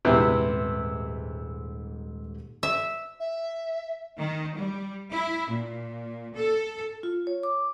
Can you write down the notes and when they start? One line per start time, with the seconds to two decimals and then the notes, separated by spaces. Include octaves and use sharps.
0.05 D#1 G#2 C3 E3 B3 G4
2.63 E5
3.20 E5
4.18 D#3
4.55 G3
5.11 E4
5.49 A#2
6.35 A4
7.03 F4
7.27 C#5
7.43 D6